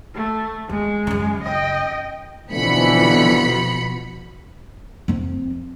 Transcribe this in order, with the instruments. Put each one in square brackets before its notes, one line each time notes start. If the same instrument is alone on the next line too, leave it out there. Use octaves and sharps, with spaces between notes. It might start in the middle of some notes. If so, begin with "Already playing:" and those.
[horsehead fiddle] A3
[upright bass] E2 [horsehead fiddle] G#3
[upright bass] F#2 C#3
[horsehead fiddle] D#5 G5
[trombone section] F2 D3 E3 [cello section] B2 F3 [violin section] B5 C#7
[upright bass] F2 C4